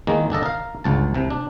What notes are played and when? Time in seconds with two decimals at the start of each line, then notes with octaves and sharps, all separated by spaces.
0.07 E2 D#3 G#3 A#3
0.30 G1 D4 A4 D#5
0.43 A#4 F5
0.84 G1 C#2 A5
1.14 C2 C3
1.30 D4